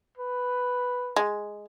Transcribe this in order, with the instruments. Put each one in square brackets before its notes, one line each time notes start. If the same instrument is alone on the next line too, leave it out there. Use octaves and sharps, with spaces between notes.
[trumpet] B4
[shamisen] G#3